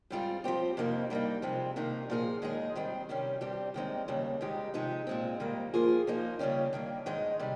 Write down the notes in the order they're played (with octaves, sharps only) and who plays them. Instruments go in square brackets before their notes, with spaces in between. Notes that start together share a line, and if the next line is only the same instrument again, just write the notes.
[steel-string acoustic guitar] G#2 G3 C4 F4 G#4
F3 C4 G4
F2 C3 D#3 A#3 D#4
G2 G3 A#3 D#4
C3 F3 G#3 C4
C3 D#3 A#3 D#4
A#2 F3 A#3 F4 G#4
D#2 D#3 G#3 D#4 G#4
G#2 D#3 G3 C4
C3 D#3 G3 C#4 G4
G2 G3 C4 G4
D#2 D#3 G#3 C4 D#4
D#2 C#3 G3
G#2 D#3 G#3 D#4 G4
C3 F3 G#3 D#4
A#2 G#3 C4
G#2 D#3 G3 A#3
F3 A#3 F4 G#4
F3 A#3 D#4
D#2 C#3 G3 C#4 G4
G2 D#3 A#3
G#2 D#3 G#3 D#4
C3 G3